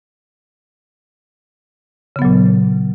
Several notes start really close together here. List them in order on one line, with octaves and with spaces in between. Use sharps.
C#3 B3 F#3 A#2